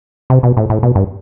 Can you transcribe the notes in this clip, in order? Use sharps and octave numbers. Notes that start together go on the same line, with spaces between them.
C3
B2
A2
A2
B2
G2